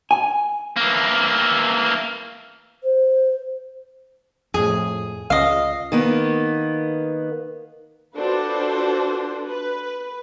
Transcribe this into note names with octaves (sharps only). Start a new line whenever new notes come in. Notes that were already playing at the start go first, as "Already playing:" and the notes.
G#5
E3 A#3
C5
F2 A2 G#4
C#2 D#5 F5
D#3 A#3 B3
D4 F4 F#4 A4 B4 C5
B4